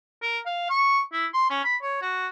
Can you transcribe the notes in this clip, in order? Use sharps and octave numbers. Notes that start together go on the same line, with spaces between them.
A#4
F5
C#6
E4
C6
C#4
B5
C#5
F#4